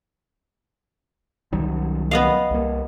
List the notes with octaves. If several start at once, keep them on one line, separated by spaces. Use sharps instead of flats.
C2 D#3 F#3
B3 D#5 F5
C2 A#3